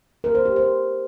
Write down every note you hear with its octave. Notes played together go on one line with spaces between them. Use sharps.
A#4
C5
G4
C5